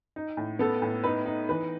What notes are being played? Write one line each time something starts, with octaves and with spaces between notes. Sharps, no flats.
D#4
A2
B3 A4
A2
D#4 B4
D#4
E3 B4